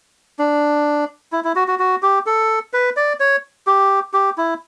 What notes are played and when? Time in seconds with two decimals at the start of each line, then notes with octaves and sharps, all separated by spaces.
0.39 D4
1.32 E4
1.44 E4
1.56 F#4
1.68 F#4
1.79 F#4
2.03 G4
2.26 A4
2.73 B4
2.97 D5
3.20 C#5
3.67 G4
4.14 G4
4.38 E4